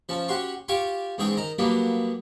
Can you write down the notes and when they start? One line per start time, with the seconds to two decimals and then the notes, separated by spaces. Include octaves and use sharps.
0.09 F3 C#4 A5
0.28 C#4 F#4 G4 F#5 C6 C#6
0.68 F4 G4 G5 G#5 C#6 D6
1.18 E2 G#2 C4 C#4 G#4 G5
1.37 D#3 D#5 A#5
1.58 F#3 G3 A#3 B3 D4